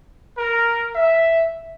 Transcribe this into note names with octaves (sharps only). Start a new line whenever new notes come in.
A#4
E5